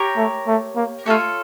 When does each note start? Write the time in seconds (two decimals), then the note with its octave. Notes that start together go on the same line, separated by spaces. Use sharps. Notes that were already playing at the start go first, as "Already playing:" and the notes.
Already playing: G4 A#4 C#5
0.16 A3
0.47 A3
0.76 A#3
1.06 A3 F4 A4 C#5